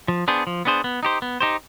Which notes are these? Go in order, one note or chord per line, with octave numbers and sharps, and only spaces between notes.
F3
B3 D4 G#4 C5
F3
B3 D4 G#4 C5
B3
D#4 G4 C5
B3
D#4 G4 C5